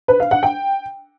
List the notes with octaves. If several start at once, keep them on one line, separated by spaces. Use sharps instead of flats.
B4
F5
F#5
G5